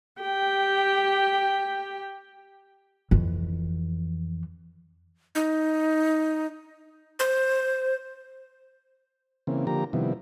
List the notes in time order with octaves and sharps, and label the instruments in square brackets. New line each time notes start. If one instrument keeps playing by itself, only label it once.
[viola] G4 G5
[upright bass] F2 E3
[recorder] D#4
C5
[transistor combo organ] C#3 E3 A#3 C4
D3 F3 A#3 G4 A#5
C3 D#3 F3 G3 B3 E4